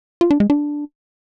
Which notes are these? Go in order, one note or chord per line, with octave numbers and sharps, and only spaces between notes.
F4
D4
G#3
D4